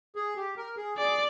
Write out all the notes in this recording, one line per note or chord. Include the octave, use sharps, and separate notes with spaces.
G#4
G4
A#4
G#4
G#4 D5